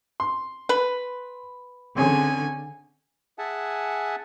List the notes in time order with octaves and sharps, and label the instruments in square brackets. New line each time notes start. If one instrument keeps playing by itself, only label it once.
[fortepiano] C6
[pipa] B4
[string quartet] D3 G#5 [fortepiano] C4 C#4 G#4
[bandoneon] G#4 E5 F#5 G#5 A5